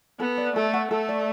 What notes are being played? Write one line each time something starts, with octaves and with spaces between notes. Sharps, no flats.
B3 A4
D5
A3 A4
F#5
A3 A4
D5